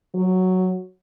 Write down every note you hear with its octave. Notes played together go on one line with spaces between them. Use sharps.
F#3